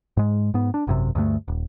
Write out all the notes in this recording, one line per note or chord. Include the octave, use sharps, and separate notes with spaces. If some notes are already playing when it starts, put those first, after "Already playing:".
G#2 G#3
G#2 B3
D4
G#1 F#2 C3
D2 G2 D3 A3
D#1